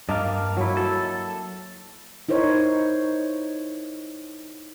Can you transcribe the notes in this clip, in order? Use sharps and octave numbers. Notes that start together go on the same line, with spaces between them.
G2 A#3 D#5 F5 A5 D6
F#3 E4
A4
D#4 E4 A#4 C5 C#5